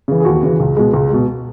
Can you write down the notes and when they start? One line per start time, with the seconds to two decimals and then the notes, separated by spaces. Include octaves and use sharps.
0.08 C#3 E3
0.20 G#4
0.25 D#2 F#4
0.43 C#3 E3
0.60 C#2
0.77 B2 G#3
0.93 C#2
1.09 B2 G#3